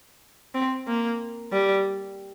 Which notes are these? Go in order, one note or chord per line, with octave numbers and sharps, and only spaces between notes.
C4
A#3
G3